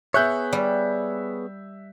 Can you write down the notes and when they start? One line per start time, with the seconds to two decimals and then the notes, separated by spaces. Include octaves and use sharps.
0.14 B3 G#4 C#5 E5 F#6 G6
0.53 G3